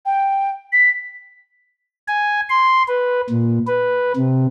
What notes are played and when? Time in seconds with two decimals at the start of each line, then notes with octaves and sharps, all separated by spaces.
0.06 G5
0.73 B6
2.08 G#5
2.50 C6
2.88 B4
3.30 A#2
3.67 B4
4.16 C3